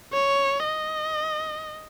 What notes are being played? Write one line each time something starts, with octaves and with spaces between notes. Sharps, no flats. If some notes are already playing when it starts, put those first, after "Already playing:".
C#5
D#5